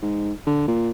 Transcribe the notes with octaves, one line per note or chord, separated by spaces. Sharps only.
G#2
D3
A#2